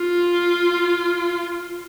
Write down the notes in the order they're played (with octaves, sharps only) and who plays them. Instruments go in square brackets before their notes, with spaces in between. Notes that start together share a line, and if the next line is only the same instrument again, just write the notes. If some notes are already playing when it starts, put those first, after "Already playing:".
Already playing: [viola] F4